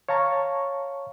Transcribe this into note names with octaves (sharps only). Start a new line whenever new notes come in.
C#5 F5 A5 A#5 C#6